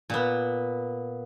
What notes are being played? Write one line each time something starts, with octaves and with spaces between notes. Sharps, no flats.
A#2 B3